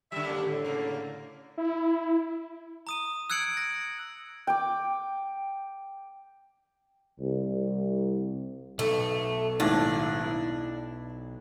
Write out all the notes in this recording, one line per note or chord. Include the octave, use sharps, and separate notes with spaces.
D3 G3 E5
F#2 A#3 D4
A2 D3
C#3 A#3
E4
A#5 D#6 D#7
E6 F#6 G#6 C#7 D7 F#7
A#6
G5 D6
C2
B1 A3
G#1 D#2 A2 D4
E4